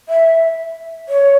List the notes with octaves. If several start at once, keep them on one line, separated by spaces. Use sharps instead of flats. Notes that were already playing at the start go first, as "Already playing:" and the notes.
E5
C#5